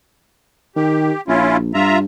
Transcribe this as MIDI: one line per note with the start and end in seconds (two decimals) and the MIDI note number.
0.76 1.12 51
0.76 1.21 67
1.28 1.73 34
1.28 1.57 61
1.28 1.57 64
1.28 1.57 65
1.74 2.05 43
1.74 1.98 65
1.74 1.98 76
1.74 1.98 82